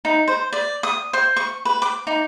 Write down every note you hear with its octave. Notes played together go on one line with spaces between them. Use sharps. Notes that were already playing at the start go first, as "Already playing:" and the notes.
D#4
C5
D5
D#6
C5
C#6
B4
D6
D#4